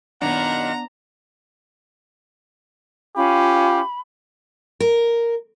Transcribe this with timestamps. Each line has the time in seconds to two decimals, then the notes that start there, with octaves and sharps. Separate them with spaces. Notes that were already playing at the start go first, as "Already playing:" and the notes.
0.22 F#2 A#2 D#3 B3 D4 F#5 A#5
3.16 C#4 F4 G4 F5 B5
4.80 A#4